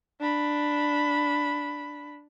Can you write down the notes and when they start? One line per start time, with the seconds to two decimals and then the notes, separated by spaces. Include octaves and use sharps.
0.20 D4 B5